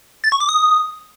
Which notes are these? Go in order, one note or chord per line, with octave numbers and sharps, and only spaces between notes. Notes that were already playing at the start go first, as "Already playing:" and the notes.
A6
C#6
D6
D#6